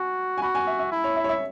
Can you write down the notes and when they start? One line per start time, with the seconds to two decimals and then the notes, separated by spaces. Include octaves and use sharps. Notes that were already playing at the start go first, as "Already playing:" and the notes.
Already playing: F#4 G#5
0.38 G#5
0.42 F#4 B5
0.55 G#5
0.67 E5
0.79 E5
0.92 E4
1.04 C#5
1.16 E5
1.24 C#5
1.29 E5